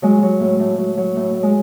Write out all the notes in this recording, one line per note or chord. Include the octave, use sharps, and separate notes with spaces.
F#3 G#3
F#3
A2
A2
F#3
F#3
A2
A2
G#3